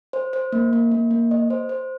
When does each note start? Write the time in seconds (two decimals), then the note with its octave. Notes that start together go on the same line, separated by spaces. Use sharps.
0.13 C5
0.33 C5
0.52 A#3
0.73 A#3
0.91 A#3
1.11 A#3
1.31 D#5
1.50 C5
1.69 C5